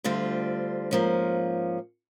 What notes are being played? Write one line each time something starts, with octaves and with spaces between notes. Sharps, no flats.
D2 D3 G3 C4 F4
G#2 F3 A#3 C#4